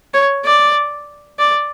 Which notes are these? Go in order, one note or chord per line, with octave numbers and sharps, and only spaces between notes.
C#5
D5
D5